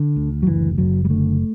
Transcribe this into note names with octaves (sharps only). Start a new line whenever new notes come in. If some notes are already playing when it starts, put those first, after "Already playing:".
Already playing: D3
D2
F#3
F#1 E3
F#1 F#3
G3
D3 A3